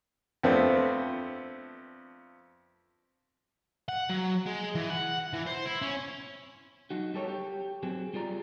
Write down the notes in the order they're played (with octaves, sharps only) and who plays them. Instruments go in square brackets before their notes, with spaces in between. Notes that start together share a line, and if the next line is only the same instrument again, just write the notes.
[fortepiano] F2 A3 B3 C4 D4
[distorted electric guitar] F#5
F#3
G#3
E3
F#5
E3
C5
E4
C#4
[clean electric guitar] F#3 D#4 F#4
G3 G4 A4 A#4 C#5
G4
F#3 C4 G#4
G3 F4 G#4 D5 A#5